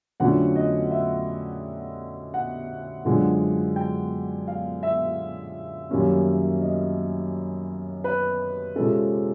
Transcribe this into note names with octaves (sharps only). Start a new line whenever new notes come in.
F2 D3 F#3 A3 C#4 F#5
D#5
E5
F#5
F#2 D3 F3 G#3
G5
F5
E5
F#2 D#3 G3 A#3 C#4
D#5
B4
C3 F3 G#3 C#4 A4